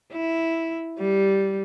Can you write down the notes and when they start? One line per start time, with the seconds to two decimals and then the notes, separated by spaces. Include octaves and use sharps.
0.13 E4
0.99 G3